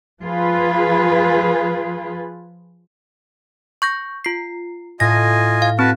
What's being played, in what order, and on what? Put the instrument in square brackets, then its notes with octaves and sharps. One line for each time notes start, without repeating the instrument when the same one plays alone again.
[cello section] F3 F4 G#4 B4
[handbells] C#6 G6 A#6
F4 C7
[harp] A2 [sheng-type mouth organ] F4 D#5 G#5 [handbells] A#6
[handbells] F5
[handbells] C4 [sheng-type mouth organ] F#4 B4 A5